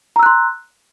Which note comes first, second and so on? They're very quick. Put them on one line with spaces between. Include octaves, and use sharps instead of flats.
A#5 E6 F#6 C6